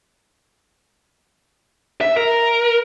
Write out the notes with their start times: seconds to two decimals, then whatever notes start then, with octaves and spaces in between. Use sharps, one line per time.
2.01 E5
2.17 A#4